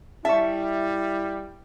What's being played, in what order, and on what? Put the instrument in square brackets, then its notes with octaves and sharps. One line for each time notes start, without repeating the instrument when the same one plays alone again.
[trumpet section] G3 [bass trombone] E4 [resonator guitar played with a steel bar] E5 [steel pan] A5 C#6